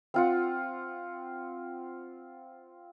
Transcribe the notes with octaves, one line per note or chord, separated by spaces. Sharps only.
C4 F4 F#5